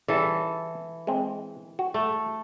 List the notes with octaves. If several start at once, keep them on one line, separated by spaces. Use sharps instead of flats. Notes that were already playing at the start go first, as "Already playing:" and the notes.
C#3 E3 G3 A4
G#3 C4
F#4
A3